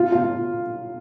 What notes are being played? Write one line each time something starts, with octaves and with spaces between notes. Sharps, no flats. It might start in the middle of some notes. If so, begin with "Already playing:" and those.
Already playing: F4
F4